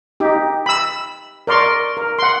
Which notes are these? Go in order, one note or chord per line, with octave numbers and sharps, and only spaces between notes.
D#4 G4
B5 E6
A#4 D5 C6 C#6
A#4
F#5 C6